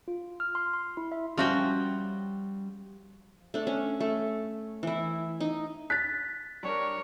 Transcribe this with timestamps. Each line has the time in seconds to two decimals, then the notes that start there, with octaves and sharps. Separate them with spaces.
0.08 F4
0.40 F6
0.55 C6
0.73 C6
0.97 E4
1.12 E5
1.38 F3 G3 C#4 F#4 E5 G5
3.54 A3 D4
3.67 C#4
4.00 A3
4.83 E3 E4
5.40 D#4
5.90 F#6 A6 B6
6.63 G3 D4 A#4 C#5